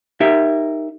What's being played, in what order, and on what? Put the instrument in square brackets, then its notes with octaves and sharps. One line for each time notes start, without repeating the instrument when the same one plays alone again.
[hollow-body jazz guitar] D#4 G4 A#4 E5